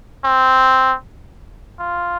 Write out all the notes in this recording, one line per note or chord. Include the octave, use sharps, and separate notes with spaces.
C4
F4